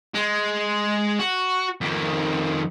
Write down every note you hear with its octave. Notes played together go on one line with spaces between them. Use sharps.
G#3
F#4
F2 D#3